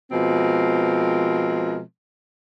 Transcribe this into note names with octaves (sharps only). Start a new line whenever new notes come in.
B2 F3 G#3 C4 A#4